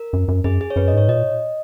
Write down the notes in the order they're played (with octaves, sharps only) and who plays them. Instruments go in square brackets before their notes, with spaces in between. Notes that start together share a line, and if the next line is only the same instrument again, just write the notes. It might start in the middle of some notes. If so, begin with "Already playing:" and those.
Already playing: [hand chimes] A#4
[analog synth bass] F#2
F#2
[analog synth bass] F#2 [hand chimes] G#4
[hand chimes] G#4
C#5
[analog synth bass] F#2 [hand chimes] B4
[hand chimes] D#5
[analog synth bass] G#2 [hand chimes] C#5
[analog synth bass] A#2 [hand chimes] D#5